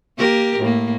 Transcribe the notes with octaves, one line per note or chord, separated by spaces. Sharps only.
A#3 G4 A#4
A2 A#3